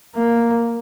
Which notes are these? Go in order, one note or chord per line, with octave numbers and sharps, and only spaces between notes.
A#3